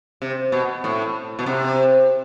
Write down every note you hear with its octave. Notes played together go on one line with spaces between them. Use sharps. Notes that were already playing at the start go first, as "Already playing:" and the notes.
C3
B2
A2
B2
C3